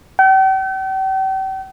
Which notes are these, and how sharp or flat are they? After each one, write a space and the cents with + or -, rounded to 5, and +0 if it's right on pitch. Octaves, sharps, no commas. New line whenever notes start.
G5 -40